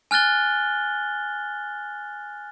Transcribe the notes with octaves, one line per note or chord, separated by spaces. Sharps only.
G#5 F6 F#6 A6 G7